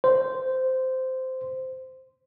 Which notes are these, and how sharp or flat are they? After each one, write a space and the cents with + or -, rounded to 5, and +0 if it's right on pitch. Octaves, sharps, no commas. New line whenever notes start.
C5 -10